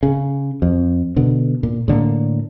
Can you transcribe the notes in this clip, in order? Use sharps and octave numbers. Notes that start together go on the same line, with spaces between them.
C#3
F2
B2 D3
A#2
A2 D3 A3 A#3